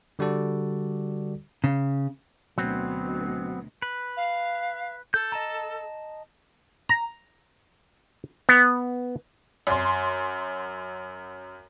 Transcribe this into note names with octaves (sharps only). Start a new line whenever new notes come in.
D3 G3 F#4 A4 D5
C#3
D2 B2 F#3 B3 C4
B4
F5
A4 G6
D#5 A5 A#5
A#5
B3
F#2 C6